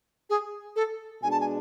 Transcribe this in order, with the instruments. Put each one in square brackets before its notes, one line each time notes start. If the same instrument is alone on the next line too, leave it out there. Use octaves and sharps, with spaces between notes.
[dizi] G#4
A4
[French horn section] B2 G#3 D4 G#4 [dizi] G#5
[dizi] A5
G#5